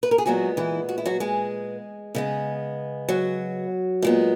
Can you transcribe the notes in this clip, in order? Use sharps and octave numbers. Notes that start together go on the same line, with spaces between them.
B4
A#4
G#4
A#2 F#3 G#3 B3 F#4
E3 E4
F#4
E4
F#3 F#4
G#3 G#4
C#3 G#3 B3
F#3 F#4
A#2 G#3 B3